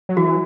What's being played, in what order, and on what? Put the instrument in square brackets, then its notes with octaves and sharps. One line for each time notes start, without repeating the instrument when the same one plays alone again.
[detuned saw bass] F#3
[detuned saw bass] E3 [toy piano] F#4